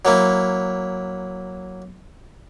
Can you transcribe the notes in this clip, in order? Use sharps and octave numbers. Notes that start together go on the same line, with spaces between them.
F#3 A#3 E4